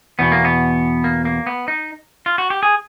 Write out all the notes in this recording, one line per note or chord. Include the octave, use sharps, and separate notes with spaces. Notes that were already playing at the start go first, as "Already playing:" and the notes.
E2 B2 B3
A#3
B3
A#3
A#3
B3
D#4
F4
F#4
G4
G#4